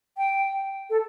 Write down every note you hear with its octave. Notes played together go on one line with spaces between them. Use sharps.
G5
A4